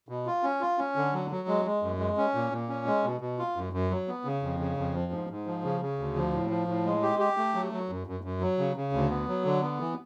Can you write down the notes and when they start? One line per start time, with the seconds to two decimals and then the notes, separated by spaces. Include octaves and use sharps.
0.09 B2
0.26 F4
0.43 C#4
0.61 F4
0.78 C#4
0.96 D3
1.13 F#3
1.30 F#3
1.48 G#3
1.65 G#3
1.82 F#2
1.99 G#3
2.17 C#4
2.35 A#2
2.52 A#2
2.69 C#4
2.86 G#3
3.04 B2
3.21 B2
3.39 F4
3.56 F#2
3.73 F#2
3.91 F#3
4.08 B3
4.25 C#3
4.42 F2
4.59 C#3
4.77 F2
4.94 F3
5.12 G#2
5.30 G#2
5.46 F3
5.64 C#3
5.81 C#3
5.99 D2
6.16 F3
6.34 A2
6.50 F3
6.68 A2
6.86 G#3
7.02 G4
7.19 G4
7.37 A3
7.55 F#3
7.72 F#3
7.89 F#2
8.07 F#2
8.24 F#2
8.41 F#3
8.58 C#3
8.76 C#3
8.93 D2
9.10 B3
9.28 F#3
9.45 D3
9.62 B3
9.80 E3